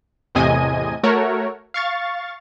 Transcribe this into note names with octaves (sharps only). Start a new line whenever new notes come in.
E2 A2 C3 D#5 G#5 D#7
A3 F#4 A#4 C#5
F5 C#6 A6